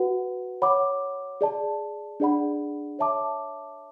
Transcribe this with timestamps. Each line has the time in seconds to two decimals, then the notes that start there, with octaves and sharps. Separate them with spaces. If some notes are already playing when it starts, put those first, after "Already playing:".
Already playing: F#4 B4 F#5
0.62 C#5 F#5 B5 D6
1.41 G#4 D5 A5
2.20 D4 G#4 D5 F#5 B5
2.99 C#5 E5 A5 D6